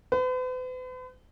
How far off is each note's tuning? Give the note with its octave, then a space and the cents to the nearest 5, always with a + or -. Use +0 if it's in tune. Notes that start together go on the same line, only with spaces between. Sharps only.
B4 +45